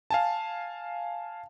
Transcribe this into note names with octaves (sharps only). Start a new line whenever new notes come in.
F5 G#5 A5